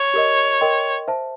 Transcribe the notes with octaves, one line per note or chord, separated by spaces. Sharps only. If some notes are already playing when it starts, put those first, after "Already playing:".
Already playing: C#5
G4 A#4 D#5
A#4 D#5 G5 C6
C5 E5 A5